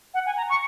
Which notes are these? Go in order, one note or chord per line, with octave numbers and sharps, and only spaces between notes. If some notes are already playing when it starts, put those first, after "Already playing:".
F#5
G#5
A#5
C#6